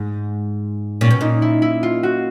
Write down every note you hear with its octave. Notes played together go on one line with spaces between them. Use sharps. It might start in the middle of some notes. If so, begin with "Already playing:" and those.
Already playing: G#2
A#2 C#4
B2
A#2 D#4
E4
E4
F4
F#4